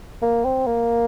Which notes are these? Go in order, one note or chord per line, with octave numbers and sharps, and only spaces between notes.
A#3
C4
A#3